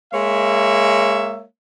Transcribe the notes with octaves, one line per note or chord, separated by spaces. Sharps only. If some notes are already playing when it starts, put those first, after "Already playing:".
G#3 A#3 C#5 E5